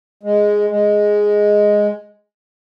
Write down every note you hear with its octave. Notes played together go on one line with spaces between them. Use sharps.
G#3
G#3